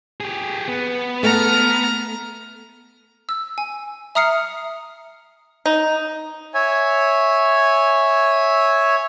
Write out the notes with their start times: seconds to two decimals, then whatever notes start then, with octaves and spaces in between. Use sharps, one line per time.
0.20 G4 G#4
0.68 B3
1.23 A3 A#5 F6
3.29 E6
3.58 G#5
4.15 E5 A#5 D#6 F6 C7 C#7
5.66 D#4
6.54 C#5 E5 G#5